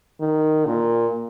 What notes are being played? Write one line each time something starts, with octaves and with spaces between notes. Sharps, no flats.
D#3
A#2